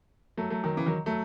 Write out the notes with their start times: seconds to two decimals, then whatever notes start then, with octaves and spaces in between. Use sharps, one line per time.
0.37 F#3 A3
0.50 F#3 A3
0.63 D#3 F#3
0.77 C#3 E3
0.86 D#3 F#3
1.06 F#3 A3